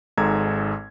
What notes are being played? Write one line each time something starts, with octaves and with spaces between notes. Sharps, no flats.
G#1 G#2 G#4 A4 A#5 G#6